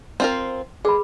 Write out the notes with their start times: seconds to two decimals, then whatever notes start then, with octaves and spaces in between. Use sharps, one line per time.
0.20 C4 F4 A#4
0.85 G#3 G#4 B4 B5